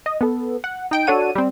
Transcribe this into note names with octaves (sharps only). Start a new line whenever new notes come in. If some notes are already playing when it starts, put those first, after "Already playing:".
D#5
B3 A4
F#5
D#4 G5 D7
D4 F#4 A4 C#5 F#5 D#7
G3 C4